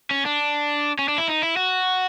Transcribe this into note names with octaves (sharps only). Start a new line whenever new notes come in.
C#4
D4
C#4
D4
E4
D#4
E4
F#4